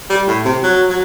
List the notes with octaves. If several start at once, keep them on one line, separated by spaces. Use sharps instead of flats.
G3
A2
C3
F#3
F#3